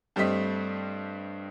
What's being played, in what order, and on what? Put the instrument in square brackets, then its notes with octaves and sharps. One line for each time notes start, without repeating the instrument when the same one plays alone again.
[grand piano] G2 G3 A3 C4 D#5 B6